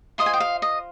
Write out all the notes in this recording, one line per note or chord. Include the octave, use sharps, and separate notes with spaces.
F4 C5 D#5 C6 D#6
G#5
G5
F5
D#5